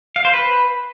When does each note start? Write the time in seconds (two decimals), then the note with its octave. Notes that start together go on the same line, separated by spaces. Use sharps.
0.16 F5
0.25 C5
0.33 B4